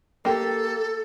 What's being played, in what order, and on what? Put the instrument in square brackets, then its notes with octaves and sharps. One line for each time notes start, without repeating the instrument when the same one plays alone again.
[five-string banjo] A#3 G4 [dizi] A4